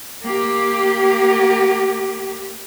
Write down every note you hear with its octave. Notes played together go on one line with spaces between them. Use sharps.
A#3 G4